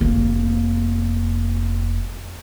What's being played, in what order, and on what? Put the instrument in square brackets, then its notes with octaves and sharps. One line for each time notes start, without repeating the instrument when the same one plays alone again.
[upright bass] F1 A#3